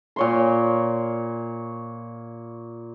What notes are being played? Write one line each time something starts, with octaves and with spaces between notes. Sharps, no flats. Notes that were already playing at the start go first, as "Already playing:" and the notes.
A#2 C#5 C6